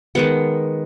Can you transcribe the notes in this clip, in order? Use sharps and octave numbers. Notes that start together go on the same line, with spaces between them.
D#3 G#3 B3 F#5